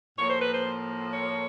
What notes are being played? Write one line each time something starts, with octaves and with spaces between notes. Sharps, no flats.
A2 F3 A#3 C#5
C5
B4
C5
C#5